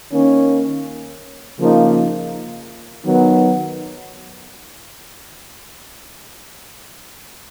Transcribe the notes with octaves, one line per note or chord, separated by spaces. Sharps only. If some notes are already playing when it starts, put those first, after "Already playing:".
D#3 A#3 C#4
C#3 F3 A#3 D#4
D#3 F#3 B3 D#4